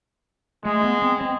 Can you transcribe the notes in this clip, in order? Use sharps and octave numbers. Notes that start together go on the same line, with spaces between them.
G#3 A3
B3
C4
C4